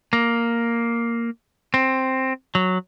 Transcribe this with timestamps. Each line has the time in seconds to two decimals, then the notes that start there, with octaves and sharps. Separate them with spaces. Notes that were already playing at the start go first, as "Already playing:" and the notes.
0.13 A#3
1.74 C4
2.55 F#3